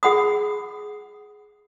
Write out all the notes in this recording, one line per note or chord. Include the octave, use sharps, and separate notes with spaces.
G#4 F#5 B5 D#6